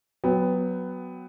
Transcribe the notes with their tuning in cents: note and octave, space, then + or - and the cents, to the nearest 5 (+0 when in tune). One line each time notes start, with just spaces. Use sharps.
F#3 +0 B3 +10 G5 +10